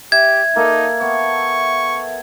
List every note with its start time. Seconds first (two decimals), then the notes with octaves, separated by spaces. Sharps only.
0.12 G4 E5 G#6
0.56 A#3 D#4 A4
1.01 B3 C#6